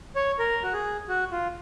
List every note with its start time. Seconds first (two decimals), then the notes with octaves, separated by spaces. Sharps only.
0.16 C#5
0.39 A#4
0.63 F#4
0.73 G#4
1.08 F#4
1.32 F4